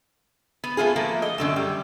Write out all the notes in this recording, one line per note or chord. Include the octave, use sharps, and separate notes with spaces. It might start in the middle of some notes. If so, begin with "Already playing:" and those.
B3
A3 B3 F4 G#4
F3 A3 A#3
D#5
F#2 D3 A3
G3